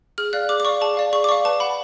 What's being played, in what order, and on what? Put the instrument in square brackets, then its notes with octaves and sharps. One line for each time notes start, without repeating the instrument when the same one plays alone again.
[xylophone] G#4 F6
D5 F5 F#6
G#4 D6
D6
D5 F5 C#6
G#4 A5
D5 F5
G#4 C#6
D6
D5 F5 C#6
B4 A5
F#5 B5